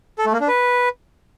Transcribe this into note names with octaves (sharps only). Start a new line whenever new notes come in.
A4
A3
A#3
D4
B4